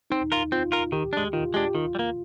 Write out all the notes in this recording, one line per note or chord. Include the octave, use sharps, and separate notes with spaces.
C4 D#4
F4 A#4
C4 F4
F4 A#4
D#3 G4
G#3 D4
D#3 F4
G#3 D4 G4
D#3 F4
G3
A#3